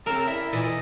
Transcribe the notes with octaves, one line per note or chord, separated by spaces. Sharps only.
C#3 C4 A4 A#4 A5 A#5 E6
E4 D5 E5
A#2 E3 A4 D5 D#5